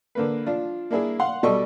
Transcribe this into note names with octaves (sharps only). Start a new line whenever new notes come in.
D3 A#3 B4
F3 D4 F4
A#3 D4 E4 G#4 A#4
F5 F#5 C6
B2 G3 A4 D5 D#5 C#6